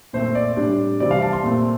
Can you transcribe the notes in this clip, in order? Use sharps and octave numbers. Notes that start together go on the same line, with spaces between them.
A#2 A3 C4 C5
D5
A2 G3 D4
C3 E3 G3 C4 D5
F5
A5
C6
A#2 A3 C4